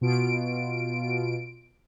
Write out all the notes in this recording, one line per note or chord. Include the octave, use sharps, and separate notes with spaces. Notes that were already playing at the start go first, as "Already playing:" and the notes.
B2 F4 D7